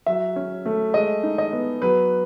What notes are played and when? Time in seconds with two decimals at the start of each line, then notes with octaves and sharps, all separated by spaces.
0.06 F#3 E5
0.36 C#4
0.66 A3
0.94 G#3 D#5
1.23 D#4
1.38 D#5
1.53 B3
1.81 F#3 B4